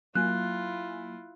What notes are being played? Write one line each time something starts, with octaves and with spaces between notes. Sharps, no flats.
F#3 A#3 E4 F4 G#5 F#6